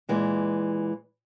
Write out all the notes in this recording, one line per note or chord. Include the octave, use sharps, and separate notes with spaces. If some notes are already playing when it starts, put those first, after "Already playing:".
A#2 E3 G#3